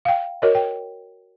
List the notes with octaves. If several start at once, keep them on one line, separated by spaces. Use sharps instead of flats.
F5 G5
F#4 A#4 C#5 D#5
G5